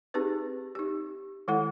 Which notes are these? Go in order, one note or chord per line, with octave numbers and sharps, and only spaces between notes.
C4 D#4 G4 G#4 B4
D#4 G4
D#3 G#3 E4 A4 F#5